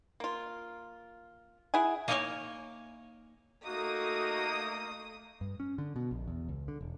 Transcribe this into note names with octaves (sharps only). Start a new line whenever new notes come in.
A#3 F4
E4 G#4 F#5 G#5
A#3 D#4 A#4 C#5 D#5 G#5
A3 A#3 D#4 F#4 D#6
G2
C#4
D3
B2
A#1
E2
C#2
D3
E1